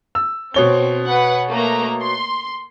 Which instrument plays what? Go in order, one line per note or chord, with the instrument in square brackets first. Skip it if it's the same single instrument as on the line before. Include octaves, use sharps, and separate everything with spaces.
[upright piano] E6
[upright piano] B2 C#5 G7 [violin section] C4
[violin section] B4 F#5
A3 A#3 A#5
C6